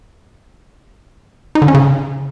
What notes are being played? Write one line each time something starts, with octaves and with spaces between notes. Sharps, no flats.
D#4
D3
C#4
C#3